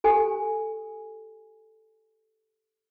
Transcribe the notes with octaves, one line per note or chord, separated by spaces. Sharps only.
G4 A4 G#5